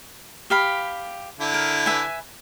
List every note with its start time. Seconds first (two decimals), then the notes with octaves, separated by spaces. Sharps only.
0.50 G4 F5 B5
1.40 D3 E4
1.54 A#4
1.86 B4 E5 G#5